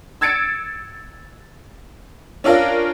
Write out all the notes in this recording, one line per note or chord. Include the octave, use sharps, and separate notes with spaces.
E6 G#6 A6 C#7 D7
C#4 D4 F4 A#4